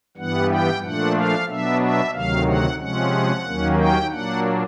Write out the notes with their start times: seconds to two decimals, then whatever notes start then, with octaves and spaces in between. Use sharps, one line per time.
0.17 G2 E3 G3 B3 F#5
0.50 G5
0.83 A#2 F3 A3 D4 F#5
1.16 F5
1.48 B2 F#3 B3 D4 E5
1.81 E5
2.14 D2 C3 D#3 F#3 F5
2.47 F#5
2.79 C3 F3 G#3 C#4 F#5
3.45 D#2 D#3 F#3 A#3 C#4
3.78 G5
4.10 A#2 F#3 A#3 D4 F#5